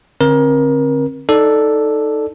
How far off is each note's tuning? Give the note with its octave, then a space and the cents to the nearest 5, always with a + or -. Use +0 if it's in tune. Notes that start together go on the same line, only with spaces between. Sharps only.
D3 +0 C4 +35 A#4 +25
D#4 +0 A4 +0 D5 +0